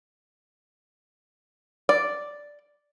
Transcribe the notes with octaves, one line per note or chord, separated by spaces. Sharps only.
D5